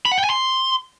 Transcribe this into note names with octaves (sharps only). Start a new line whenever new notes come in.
B5
F#5
G5
G#5
C6